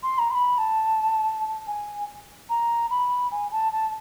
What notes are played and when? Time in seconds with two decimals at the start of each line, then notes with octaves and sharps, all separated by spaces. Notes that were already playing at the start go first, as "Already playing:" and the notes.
0.03 C6
0.18 A#5
0.30 C6
0.34 B5
0.58 A5
1.67 G#5
2.49 A#5
2.90 B5
3.31 G#5
3.51 A5
3.72 A5